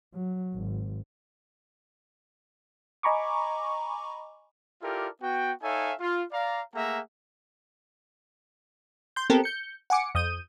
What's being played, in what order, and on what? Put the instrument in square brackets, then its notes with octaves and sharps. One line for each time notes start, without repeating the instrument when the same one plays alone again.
[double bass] F#3
G#1
[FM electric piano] D#5 G#5 A#5 B5 C#6 D6
[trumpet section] E4 F4 G4 A4 A#4 D5
B3 F#4 G5
D#4 A4 C#5 E5 F5 G#5
F4
D5 F5 A#5
A3 A#3 G#4 E5 F#5 A#5
[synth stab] C6 G6
B3 C4 G4 A4 A#4
G6 C#7
F#5 G#5 D6 C#7
F2 D#6 G6 D#7